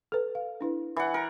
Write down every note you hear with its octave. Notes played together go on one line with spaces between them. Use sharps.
A4 B4
F5
D4 E4 B4
E3 F#5
A#4